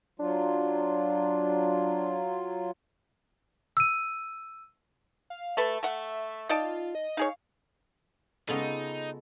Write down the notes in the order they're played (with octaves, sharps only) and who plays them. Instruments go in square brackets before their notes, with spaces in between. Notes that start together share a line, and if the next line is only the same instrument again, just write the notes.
[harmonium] F#3 F4 [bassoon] D4
[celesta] E6 D#7
[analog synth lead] F5
[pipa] A3 A4 B4 [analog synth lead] A5
[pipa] A3 F#5 [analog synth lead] E5
[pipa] D#4 D5 A5 [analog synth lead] F4
[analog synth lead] D#5
[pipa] D#4 G#4 C#5 [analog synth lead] F5
[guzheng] C#3 B3 F4 [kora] G#3 A4 [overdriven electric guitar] D#4